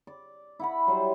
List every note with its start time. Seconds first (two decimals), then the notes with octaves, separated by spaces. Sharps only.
0.07 D5
0.59 E4 F#5 B5
0.87 F#3 G3 C5 E5